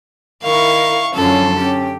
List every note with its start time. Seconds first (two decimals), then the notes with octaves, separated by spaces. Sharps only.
0.43 D#3 E4 A#4 F5 C#6
1.14 F#2 D3 F3 C#4 A4
1.57 C#4 G4